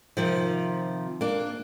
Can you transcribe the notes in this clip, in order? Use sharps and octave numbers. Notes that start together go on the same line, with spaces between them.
C3 D#3 F3
A#3 D4